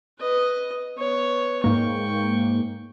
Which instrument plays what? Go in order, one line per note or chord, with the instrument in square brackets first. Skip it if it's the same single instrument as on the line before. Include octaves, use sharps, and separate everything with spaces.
[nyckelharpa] B4 D#5
B3 C#5
[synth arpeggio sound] G#2 A#3 [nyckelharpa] G5 C#6